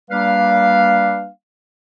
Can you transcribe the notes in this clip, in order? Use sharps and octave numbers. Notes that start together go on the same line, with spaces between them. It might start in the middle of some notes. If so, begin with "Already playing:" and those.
G3 A#3 D4 B4 F5